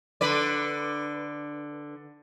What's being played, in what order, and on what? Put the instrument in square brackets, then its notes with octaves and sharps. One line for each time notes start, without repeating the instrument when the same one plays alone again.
[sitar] D3 B4 D5